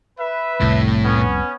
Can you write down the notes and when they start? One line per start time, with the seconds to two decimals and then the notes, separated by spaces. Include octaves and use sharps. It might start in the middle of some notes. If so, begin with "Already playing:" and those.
0.19 B4 E5
0.61 F1 C2 A2
1.04 B3 C#4